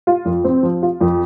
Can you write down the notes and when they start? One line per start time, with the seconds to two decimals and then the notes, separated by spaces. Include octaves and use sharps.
0.07 F4
0.25 F2
0.44 C4
0.63 F3
0.82 F4
1.01 F2